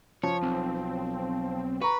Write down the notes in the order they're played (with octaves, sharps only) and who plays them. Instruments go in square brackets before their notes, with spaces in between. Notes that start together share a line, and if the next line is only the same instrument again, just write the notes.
[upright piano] F3 [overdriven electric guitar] C#5
[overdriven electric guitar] B1 [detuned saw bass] C4
[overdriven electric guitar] B4 [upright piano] A#5 C#6